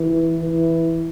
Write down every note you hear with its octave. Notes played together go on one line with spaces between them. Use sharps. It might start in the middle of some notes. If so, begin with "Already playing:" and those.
Already playing: E3
E3